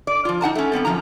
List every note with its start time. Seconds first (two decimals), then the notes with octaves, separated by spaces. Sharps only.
0.07 D5
0.25 F3 F4
0.41 D#4 F#5 A5 A#5
0.55 A3 C#4
0.72 F#2 B3 C4 A4
0.85 F#2 A#2 F3 F4 A#5